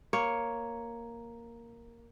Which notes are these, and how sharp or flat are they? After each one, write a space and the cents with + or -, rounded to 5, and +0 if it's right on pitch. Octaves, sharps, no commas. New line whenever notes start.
A#3 +0 C#5 +0